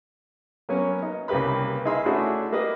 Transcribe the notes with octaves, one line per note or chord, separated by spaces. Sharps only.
F#3 A#3 B3 C#4
D#4
C2 C#3 A#3 G4 B4 B5
D#4 E4 G#4 F5 B5 C6
A3 C#4 D4 E4 F#4 G#4
A#3 G4 B4 D#5